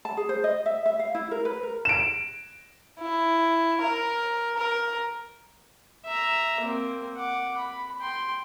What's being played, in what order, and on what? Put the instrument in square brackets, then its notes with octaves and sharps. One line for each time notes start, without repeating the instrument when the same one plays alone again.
[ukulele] A5
G#4
C5
D#5
E5
E5
F5
E4
A#4
B4
A#4
[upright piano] D7 E7
[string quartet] E4
A#4
A#4
[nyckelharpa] E5 A#5
A#3 C4
F#5 D6
B5
G5 C6